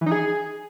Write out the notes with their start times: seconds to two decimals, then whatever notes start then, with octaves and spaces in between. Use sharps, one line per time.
0.01 E3
0.06 D#4
0.12 G#4